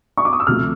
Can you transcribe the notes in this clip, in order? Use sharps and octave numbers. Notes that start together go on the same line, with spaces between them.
C#6
D6
D#6
E6
D2 C3 F3 A3 F6